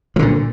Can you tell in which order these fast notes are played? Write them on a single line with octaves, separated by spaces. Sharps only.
F3 D3 A#2